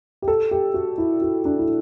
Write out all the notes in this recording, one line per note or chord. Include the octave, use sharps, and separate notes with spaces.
G4
A4
G4
F#4
E4
F#4
D4
E4